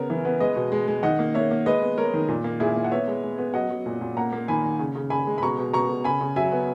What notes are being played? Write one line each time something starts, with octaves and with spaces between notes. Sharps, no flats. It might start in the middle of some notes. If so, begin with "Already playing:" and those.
Already playing: C#3 B3 A#4 C#5
E3
B3
G#3 B4 D#5
B2
G#3
G#3
D#3 D#5 F#5
A#3
A#3 C#5 E5
A#3
G#3 B4 D#5
B3
G#3 A#4 C#5
D#3
A#2
A#3
A#2 E4 G#4
A#3
F#5
B3 C#5 E5
G#3
G#3
B3
F#3 D#5 F#5
F#3
A#2
A#2
A#3 F#5 A#5
A#3
D#3 G#5 B5
D#3
C#3
C#3
C#3 G#5 B5
G#3
B5
B2 A#5 C#6
B2
B2 A#5 C#6
B2
C#3 G#5 B5
C#3
F#3 E5 G#5
B3